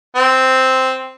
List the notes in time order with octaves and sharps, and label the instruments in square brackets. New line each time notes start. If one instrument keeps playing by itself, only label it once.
[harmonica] C4